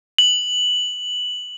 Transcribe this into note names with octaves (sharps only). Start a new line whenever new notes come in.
F#7